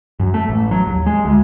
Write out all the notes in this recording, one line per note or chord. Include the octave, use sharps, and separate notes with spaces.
F#2
A3
A1
F#3
D#2
G#3
D2